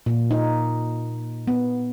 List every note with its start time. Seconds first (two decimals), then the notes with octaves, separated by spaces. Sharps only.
0.06 A#2
0.31 D#4
1.48 B3